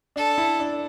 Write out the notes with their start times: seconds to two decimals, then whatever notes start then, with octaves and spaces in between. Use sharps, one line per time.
0.16 D4 A4
0.38 E4
0.60 D4